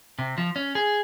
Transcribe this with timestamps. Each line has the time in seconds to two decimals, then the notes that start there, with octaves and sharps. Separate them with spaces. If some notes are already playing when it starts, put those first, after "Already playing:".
0.19 C3
0.38 F3
0.56 C#4
0.75 G#4